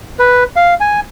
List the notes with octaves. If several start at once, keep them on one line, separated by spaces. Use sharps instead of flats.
B4
F5
G#5